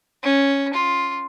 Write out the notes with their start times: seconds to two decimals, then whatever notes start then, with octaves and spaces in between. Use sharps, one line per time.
0.23 C#4
0.74 F4